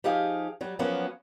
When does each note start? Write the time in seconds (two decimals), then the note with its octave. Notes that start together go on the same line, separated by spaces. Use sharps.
0.04 F3 D#4 G4 G#4 F5
0.61 F#3 G3
0.79 F3 F#3 A#3 B3 C#4